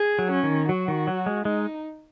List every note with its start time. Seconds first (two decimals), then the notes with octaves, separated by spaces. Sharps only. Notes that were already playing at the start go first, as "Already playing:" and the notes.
Already playing: G#4
0.19 F#3
0.32 C#4
0.43 D#3
0.69 F#3 F#4
0.88 D#3
1.07 F#3
1.26 G#3
1.45 G#3 D#4